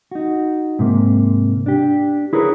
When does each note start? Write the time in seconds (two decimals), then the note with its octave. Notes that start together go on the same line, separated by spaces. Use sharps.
0.11 D#4 F#4
0.79 G#2 C3 A#3
1.66 D4 G4
2.33 E4 G#4 A#4 B4 C#5